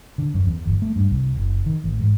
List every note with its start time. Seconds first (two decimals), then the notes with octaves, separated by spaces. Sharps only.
0.18 D3
0.34 F#2
0.46 E2
0.65 G1
0.82 A3
0.96 G2
1.11 C2
1.37 F#1
1.66 D#3
1.84 A1
1.99 G#2